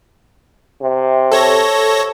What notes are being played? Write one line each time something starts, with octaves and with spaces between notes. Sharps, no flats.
C3
A4 C#5 A#6